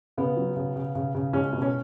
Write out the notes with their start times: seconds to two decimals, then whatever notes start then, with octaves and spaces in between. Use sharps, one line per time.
0.17 C#3 B3
0.37 F#3
0.56 C#3
0.76 C#3
0.95 C#3
1.15 C#3
1.33 G#3 C#4
1.53 B2
1.62 C#4